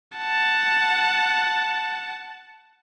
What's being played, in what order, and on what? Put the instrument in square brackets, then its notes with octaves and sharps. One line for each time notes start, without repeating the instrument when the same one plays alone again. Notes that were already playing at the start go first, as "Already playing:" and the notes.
[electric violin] F#5 A5